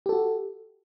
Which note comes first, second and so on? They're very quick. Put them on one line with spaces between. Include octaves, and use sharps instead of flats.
G4 A4 F#4